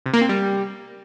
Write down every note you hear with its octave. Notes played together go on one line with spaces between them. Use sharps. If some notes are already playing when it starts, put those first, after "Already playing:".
C3
A#3
C4
G3